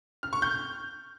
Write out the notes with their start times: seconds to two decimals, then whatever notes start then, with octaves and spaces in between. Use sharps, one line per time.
0.23 F6
0.33 C#6
0.42 G6